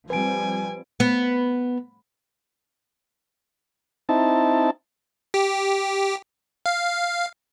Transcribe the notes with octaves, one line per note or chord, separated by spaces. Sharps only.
F3 G3 C4 B4 G#5 D7
B3
C4 D#4 E4 A5
G4
F5